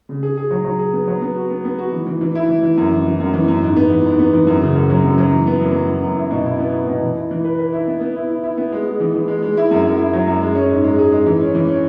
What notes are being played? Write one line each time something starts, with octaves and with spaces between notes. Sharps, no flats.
C#3
G#4
G#4
F#3
F#3
G#4
B3
F#3
B3
F#4
B3
B3
F#4
E3
E3
E3
E4
E3
E3
F#2
E3
E3
F#2
E3
F#2
G#2
B3
E3
G#2
B3
E3
F#2
C#3
F#2
F#3
F#2
F#3
E3
B3
F#2
F#2
E3
F#2
E4
B2
E4
B3
E4
B2
E3
E4
E3
B4
B4
E4
B3
B3
E4
E4
E4
B3
G#3
G#3
E3
E3
G#3
G#3
E4
F#2
F#2
E4
F#3
F#2
G#3
C#4
G#2
G#3
G#4
G#3
E3
C#4
E3
C#4